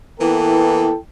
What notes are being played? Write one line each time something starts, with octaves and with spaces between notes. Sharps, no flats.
E3 A#3 B3 E4 A4 G5